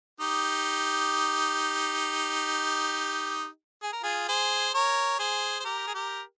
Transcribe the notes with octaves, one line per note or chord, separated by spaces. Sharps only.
D#4 G4
G#4
A#4
F4 G#4
G#4 C5
A#4 C#5
G#4 C5
C5
G4 A#4
G#4
G4 A#4